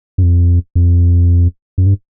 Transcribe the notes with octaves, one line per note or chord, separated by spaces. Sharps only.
F#2
F2
F2
F#2
G2